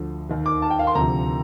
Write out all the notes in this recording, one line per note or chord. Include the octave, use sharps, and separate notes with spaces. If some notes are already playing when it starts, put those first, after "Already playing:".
Already playing: D2 D3 F3
D#2 D#3
D6
A5
G5
F5
C6
D2 C3 F3 A#5